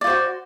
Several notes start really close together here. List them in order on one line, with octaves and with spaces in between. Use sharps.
D5 F4 C5 F#4